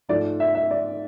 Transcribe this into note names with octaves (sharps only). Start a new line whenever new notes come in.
G#2 F3 A3 D5
E5
E5
D5